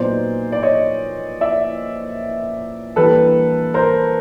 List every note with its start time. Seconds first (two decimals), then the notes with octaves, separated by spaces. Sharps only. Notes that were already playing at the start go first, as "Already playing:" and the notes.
Already playing: A#2 F#3 B3 D#4 C5 D5
0.52 D5
0.63 C#5 D#5
1.41 D5 E5
2.96 E3 G3 A#3 D4 A4 B4
3.74 A#4 C5